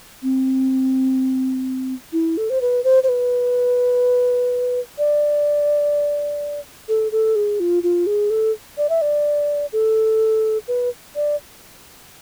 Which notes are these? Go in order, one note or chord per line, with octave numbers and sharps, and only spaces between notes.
C4
E4
A4
C5
B4
C5
C5
B4
D5
A4
A4
G#4
F4
F4
G#4
A4
D5
E5
D5
A4
B4
D5